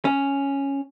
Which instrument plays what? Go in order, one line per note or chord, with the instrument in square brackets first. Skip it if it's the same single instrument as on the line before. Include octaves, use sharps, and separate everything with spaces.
[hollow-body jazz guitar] C#4